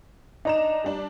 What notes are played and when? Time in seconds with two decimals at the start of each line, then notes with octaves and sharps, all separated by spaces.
0.45 D4 D#4 A#5 E7
0.84 G3 D4